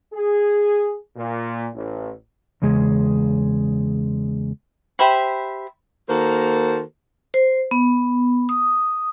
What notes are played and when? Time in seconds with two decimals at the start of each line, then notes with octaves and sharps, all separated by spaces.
0.14 G#4
1.17 A#2
1.75 A1
2.62 E2 C#3 G#3 G#4
4.99 G4 C5 E5 B5
6.09 D#3 A#3 F#4 A4 A#4 C5
7.34 C5
7.71 B3
8.49 D#6